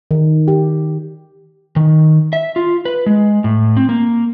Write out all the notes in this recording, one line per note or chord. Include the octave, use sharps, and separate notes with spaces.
D#3
G4
D#3
E5
F4
B4
G#3
A2
C4
A#3